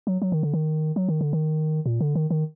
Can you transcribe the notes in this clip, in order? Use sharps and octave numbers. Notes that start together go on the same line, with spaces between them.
F#3
F#3
D#3
D3
D#3
F#3
D#3
D3
D#3
A#2
D3
D#3
D#3